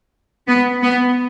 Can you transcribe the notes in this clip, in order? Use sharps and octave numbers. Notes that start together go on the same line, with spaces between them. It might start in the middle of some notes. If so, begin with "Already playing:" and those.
B3
B3